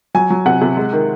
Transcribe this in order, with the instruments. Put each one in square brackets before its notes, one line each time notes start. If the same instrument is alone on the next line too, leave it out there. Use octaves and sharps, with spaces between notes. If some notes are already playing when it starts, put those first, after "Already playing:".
[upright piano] F#3 G#5
F#3
C3 F#5
C3
G#3
D#3